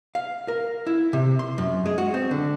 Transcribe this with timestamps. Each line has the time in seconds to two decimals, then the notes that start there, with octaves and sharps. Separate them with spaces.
0.15 F5
0.48 A#4
0.87 E4
1.13 C3
1.39 C6
1.58 F#2
1.86 G#3
1.98 F#4
2.14 C4
2.31 D3